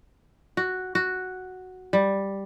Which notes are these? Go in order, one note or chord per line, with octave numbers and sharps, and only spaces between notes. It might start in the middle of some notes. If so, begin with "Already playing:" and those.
F#4
F#4
G3